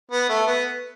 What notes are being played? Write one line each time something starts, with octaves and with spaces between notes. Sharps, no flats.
B3
A3
B3